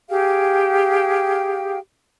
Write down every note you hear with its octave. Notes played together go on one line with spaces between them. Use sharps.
G4 G#4 F5 G5